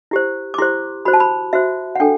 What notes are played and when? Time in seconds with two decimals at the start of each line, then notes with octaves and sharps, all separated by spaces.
0.11 E4 G4 C5
0.54 D6
0.58 E4 G4 C5 C6
1.05 F#4 C5 B5
1.13 A5
1.20 B5
1.53 F#4 C5 E5
1.95 F#5
2.00 D4 A4 G5